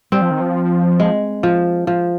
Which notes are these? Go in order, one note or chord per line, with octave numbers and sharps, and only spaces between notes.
G3 C4
F3
D#3
F3
G#3
F3
F3